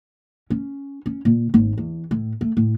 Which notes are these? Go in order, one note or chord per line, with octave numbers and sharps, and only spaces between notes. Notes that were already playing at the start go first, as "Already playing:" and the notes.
C#4
C#4
A#2
G#1
E2
A2
A3
A2